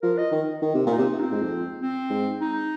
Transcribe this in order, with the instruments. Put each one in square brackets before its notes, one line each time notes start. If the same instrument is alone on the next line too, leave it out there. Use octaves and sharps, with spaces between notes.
[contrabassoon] F3 [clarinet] A#4
[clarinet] D#5
[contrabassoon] D#3
D#3
C3
[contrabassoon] A#2 [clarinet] D#4
[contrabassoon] C3
[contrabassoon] A#2 [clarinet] C4
[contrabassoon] G#2
F2
[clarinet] C4
[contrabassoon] G#2
[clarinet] D#4